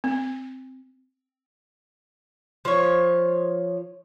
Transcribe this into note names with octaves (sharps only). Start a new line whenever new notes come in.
C4
F3 C#5